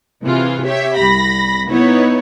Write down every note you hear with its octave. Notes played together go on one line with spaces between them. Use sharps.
C3 E3 F4 G#4
G4 C#5 E5
C2 B5 A#6
B3 D#4 E4 B4 C#5